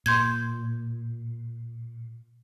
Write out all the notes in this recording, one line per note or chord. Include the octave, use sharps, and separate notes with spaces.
A#2 C6 G6 G#6